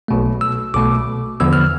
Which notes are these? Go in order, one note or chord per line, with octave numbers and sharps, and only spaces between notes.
B1 B2 A3
E6
B1 B2 A3 D6
E2 D3 F3 B3 E6
F6